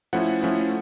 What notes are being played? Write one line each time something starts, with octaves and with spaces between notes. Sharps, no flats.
F3 A3 C#4 E4 F#5
F3 A3 C#4 E4